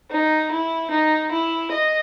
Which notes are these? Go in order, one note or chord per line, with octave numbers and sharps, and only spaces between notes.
D#4
E4
D#4
E4
D#5